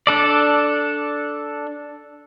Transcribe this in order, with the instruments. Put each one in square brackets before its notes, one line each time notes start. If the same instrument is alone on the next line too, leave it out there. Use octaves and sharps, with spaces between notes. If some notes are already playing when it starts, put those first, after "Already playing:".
[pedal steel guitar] D4 A4 D5